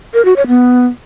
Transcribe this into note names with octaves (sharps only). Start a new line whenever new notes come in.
A#4
F#4
C#5
B3